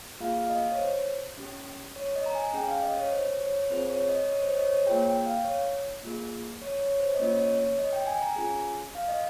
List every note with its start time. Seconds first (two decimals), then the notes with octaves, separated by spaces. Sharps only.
0.20 A#3 F4 G#4 F5
0.43 F5
0.49 D#5
0.72 C#5
0.79 C5
1.38 C#4 G4
1.96 C#5
2.15 D#5
2.26 A#5
2.35 G#5
2.53 C#4 G#4 G5
2.68 F5
2.83 D#5
2.97 C#5
3.12 C5
3.41 C#5
3.70 C4 F4 G#4 C5
3.90 C#5
4.09 D#5
4.29 C#5
4.42 C5
4.52 D#5
4.57 C#5
4.67 C5
4.72 C#5
4.86 A#3 F4 G#4 G5
5.06 G5
5.26 F5
5.44 C#5
6.03 A#3 F4 G#4
6.62 C#5
6.81 C#5
7.00 C5
7.15 D#5
7.19 A#3 C#4 F4 C#5
7.39 C#5
7.59 C#5
7.79 D#5
7.93 G5
8.07 G#5
8.22 A#5
8.36 C#4 F4 G#4 G#5
8.95 F5
9.08 D#5